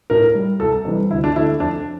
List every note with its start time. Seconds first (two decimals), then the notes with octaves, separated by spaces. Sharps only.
0.10 A2 A#4
0.35 G3
0.60 C2 A4
0.85 C3 E3 G3
1.10 D2 E4
1.24 D4
1.36 D3 A3 E4
1.60 F2 D4